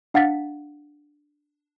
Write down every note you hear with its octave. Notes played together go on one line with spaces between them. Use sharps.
D4 F5 F#5 A6 B6